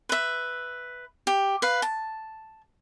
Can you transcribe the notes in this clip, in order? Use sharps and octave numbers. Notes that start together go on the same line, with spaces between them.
B4 E5
G4
B4 F5
A5